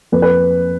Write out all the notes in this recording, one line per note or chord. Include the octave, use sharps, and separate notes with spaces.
F2 B4
B4